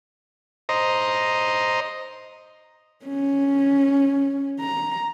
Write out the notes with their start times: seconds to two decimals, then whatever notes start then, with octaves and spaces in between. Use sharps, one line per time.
0.69 C5 D#5 A#5
3.05 C#4
4.60 A#5